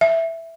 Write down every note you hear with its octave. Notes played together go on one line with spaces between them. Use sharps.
E5